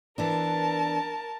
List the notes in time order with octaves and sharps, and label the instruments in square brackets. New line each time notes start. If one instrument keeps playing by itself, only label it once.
[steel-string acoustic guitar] E3 B3 D4 [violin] A#4 A5